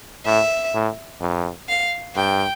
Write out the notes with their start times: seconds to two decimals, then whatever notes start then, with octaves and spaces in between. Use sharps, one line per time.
0.26 A2 E5
0.74 A2
1.21 F2
1.69 F5
2.16 G2 G5